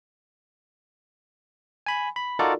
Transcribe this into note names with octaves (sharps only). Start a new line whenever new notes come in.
G#5 B5
B5
D#4 F4 F#4 A4 A#4 D5